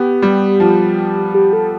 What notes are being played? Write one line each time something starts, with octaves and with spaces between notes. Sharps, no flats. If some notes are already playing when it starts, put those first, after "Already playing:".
Already playing: B3 G4
G3
F3
G4
A4